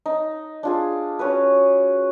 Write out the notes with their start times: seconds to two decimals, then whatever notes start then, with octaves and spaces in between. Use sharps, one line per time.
0.06 D#4
0.63 D4 F4 G#4
1.19 C#4 F#4 B4